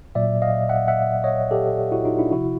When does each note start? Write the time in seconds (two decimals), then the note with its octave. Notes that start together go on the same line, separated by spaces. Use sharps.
0.15 A#2 F#3 D5 E5
0.42 D#5 F5
0.69 E5 F#5
0.88 E5 F#5
1.24 C#5 D#5
1.51 G4 A4
1.92 E4 F#4
2.05 D#4 F4
2.19 D4 E4
2.32 C3 F3 E4 F#4